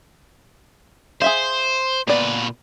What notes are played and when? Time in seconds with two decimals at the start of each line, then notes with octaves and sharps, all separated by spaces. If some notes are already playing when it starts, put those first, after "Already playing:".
1.22 G#4 C5 E5 F5
2.07 A#2 B3 B4 D5